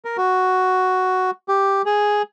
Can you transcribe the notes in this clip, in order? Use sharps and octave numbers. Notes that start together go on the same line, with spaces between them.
A#4
F#4
G4
G#4